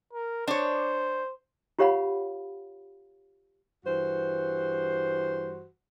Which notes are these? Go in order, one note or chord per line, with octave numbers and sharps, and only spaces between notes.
A#4
D4 C5 C#5
F4 G4 C#5 F5 F#5 B5
G2 E3 F#4 C5